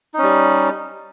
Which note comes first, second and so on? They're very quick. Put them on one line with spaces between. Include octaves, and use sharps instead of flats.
D#4 C#4 G3